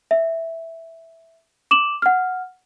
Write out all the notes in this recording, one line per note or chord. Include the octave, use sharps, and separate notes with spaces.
E5
D6 E7 F#7
F#5 F6